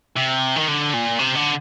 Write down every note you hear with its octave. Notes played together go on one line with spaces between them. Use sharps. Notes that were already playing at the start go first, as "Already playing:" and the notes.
C3
D#3
D3
A#2
C3
D3